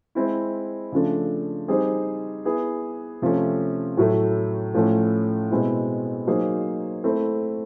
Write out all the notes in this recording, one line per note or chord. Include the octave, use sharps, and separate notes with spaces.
G#3 C4 E4
C#3 F3 A3 D4
G3 C4 D#4 G#4 C5
B3 E4 G#4
C3 F3 A3 C#4
A2 F#3 A3
A2 F3 A3 C#4
B2 G#3 C4 E4
F#3 A#3 D#4 G#4 C5
A3 C4 E4